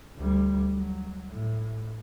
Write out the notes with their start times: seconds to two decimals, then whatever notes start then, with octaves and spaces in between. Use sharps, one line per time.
0.18 D2 G3
0.76 F#3
1.31 A2